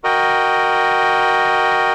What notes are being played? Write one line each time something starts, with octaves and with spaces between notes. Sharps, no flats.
F#4 A#4 D#5 G5